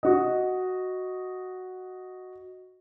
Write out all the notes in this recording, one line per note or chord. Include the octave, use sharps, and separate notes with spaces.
F#4 D#5